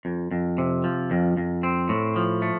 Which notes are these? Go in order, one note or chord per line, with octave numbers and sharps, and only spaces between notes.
F2
F2
C3
F3
F2
F2
C4
A2
F3
A3